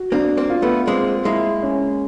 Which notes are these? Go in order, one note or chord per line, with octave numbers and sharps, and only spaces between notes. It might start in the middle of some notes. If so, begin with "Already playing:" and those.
Already playing: F#4
A#3 C4 D4
A#3 C4
F4
A3 B3
G#3 A#3 C4
G#3 A#3 E4
C#4